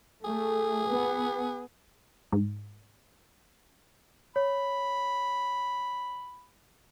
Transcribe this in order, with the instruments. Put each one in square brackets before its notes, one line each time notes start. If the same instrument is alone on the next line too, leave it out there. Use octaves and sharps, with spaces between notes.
[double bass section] A3 [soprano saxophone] G#4
[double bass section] B3
[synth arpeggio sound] G#2
[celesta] C#5 [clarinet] B5